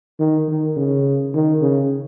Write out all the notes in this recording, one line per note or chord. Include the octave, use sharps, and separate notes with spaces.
D#3
D#3
C#3
D#3
C#3